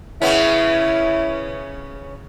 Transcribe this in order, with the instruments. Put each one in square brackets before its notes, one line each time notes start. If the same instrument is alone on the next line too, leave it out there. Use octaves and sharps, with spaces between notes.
[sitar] C#3 B3 C#4 [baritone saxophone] E4